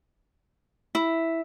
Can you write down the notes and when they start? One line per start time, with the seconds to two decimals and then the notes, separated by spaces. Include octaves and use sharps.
0.95 E4